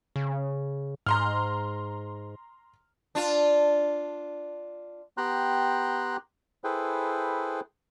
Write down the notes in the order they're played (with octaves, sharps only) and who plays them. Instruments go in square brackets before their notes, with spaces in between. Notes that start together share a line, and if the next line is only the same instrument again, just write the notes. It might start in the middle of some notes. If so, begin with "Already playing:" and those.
[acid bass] C#3
[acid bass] G#2 [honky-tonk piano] A#5 C6 F6
[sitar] D4 F4
[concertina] B3 G4 G5 A#5 C6 F#6
E4 G#4 A4 B4 C5 G5